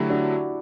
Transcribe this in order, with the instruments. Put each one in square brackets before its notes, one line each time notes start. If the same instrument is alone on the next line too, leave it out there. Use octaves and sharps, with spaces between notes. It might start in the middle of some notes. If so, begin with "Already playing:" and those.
Already playing: [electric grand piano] D3 F#3 A3 [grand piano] E4 G4
[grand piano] D4 F#4